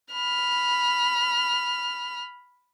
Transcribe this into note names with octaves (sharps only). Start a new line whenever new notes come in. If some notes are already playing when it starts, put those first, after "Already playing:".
B5 F6